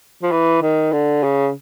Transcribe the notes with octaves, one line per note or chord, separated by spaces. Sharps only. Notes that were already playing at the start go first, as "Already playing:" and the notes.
F3
E3
D#3
D3
C#3